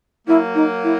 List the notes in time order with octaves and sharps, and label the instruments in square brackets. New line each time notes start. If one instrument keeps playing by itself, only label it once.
[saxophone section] F#3 A#3 [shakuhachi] E4
[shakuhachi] D#4
E4